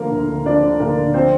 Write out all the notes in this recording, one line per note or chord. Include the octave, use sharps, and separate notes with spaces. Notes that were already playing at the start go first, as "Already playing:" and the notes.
Already playing: D3 F3 A#3 A#4
D2
D2
F3 D4 D5
D3
D2 A#3 A#4
D2
F3 C4 C5